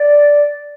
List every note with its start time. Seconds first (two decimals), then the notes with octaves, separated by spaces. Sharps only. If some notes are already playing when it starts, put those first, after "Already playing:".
Already playing: D5